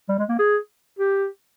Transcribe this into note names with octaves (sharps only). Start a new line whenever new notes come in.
G3
G#3
A#3
G#4
G4